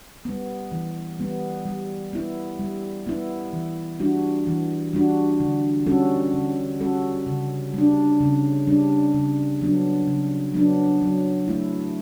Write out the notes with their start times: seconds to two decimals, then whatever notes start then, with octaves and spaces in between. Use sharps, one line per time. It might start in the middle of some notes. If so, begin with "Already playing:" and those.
0.25 G3 B3
0.72 E3
1.19 G3 B3
1.66 G3
2.13 B3 E4
2.59 G3
3.07 B3 E4
3.53 E3
4.00 G3 D4 F#4
4.47 E3
4.93 G3 D4 F#4
5.40 D3
5.86 G3 C#4 F#4 A4
6.33 D3
6.80 G3 C#4 F#4 A4
7.27 C#3
7.74 G3 D4
8.20 C#3
8.67 G3 D4
9.14 C#3
9.62 F#3 B3 D4
10.08 C#3
10.54 F#3 B3 D4
11.02 F#3
11.48 A3 E4